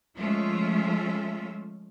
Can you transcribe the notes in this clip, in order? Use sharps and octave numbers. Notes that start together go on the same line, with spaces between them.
F3 G#3 A3 C#4 F4 E5